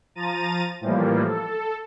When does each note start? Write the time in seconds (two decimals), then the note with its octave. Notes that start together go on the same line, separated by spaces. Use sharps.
0.15 F3 A#5 A6 D#7
0.81 A2 E3 F3 G3 A#3
1.24 A4